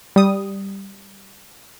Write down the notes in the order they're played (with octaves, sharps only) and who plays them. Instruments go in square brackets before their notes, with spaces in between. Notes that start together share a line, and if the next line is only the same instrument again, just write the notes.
[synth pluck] G3 D#6